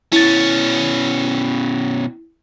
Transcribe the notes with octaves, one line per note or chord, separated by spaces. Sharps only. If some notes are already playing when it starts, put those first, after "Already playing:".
B2 C#4 E4 A6